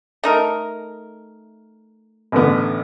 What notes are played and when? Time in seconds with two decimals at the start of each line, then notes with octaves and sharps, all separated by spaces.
0.24 A3 D#4 A#4
2.32 A1 D3 B3